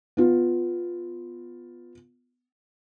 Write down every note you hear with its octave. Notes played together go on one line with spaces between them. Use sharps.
B3 F4